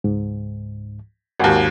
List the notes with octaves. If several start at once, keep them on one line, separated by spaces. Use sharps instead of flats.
C#2 G#2
G#1 D#2 A#4 F#5 G#5